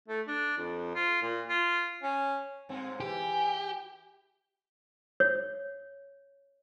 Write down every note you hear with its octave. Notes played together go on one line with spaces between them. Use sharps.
A3
D4
F2
F4
A#2
F4
C#4
G2 C4
E3 G4 G#4
C#5